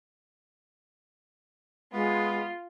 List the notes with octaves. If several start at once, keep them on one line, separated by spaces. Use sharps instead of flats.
G#3 B3 F4